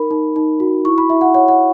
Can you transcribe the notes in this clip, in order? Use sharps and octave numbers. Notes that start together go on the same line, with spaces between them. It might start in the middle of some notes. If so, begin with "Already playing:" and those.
Already playing: D#4 A#4 B5
D#4
D#4
F#4
E4 C#6
B5
E4 E5
F#5
C#5 F#5
F#5